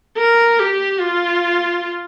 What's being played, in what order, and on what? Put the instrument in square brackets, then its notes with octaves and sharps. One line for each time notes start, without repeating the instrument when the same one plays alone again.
[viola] A#4
G4
F4